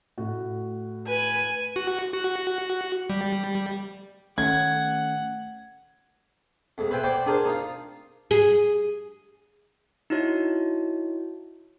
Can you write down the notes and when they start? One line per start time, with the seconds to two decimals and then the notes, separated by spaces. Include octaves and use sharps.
0.18 A2 F#4
1.07 B4 G#5
1.76 F#4
2.13 F#4
3.10 G3
4.38 D#3 A3 C#4 F#5 G#6
6.78 F2 G#3
6.91 B4 C5 E5 G5 G#5
7.03 C5 D5 F#5 G5 B5 C6
7.26 D4 G#4 A#4 C5
7.45 D#4 F4
8.31 G#4
10.10 D#4 E4 F#4 C#5